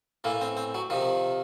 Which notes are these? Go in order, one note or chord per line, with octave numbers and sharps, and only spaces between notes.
A2 E3 A#3
C4
C4
F#3
C3 D#3 F3